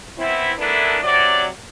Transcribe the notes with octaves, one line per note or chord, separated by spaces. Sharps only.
E3 B3 C4 E4
E3 A3 B3 D4 E4 A#4
C3 F#3 D5